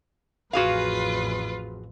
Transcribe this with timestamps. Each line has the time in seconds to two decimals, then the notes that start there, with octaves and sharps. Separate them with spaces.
0.53 A1 F2 F4 F#4 G#4 B4 F5